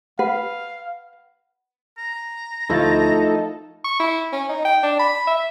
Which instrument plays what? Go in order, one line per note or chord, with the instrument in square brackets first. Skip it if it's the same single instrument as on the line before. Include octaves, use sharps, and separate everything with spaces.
[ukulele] B4 [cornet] F5 [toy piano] F#5
[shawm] A#5
[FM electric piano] D2 A6 [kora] F3 A3 E4 [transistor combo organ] D#4 A4
[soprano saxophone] C#6
E4
C#4
D#4
G5
D4
B5
E5